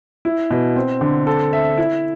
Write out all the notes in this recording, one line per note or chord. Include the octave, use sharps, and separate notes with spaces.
E4
B2
C4
D3
A4
E5
E4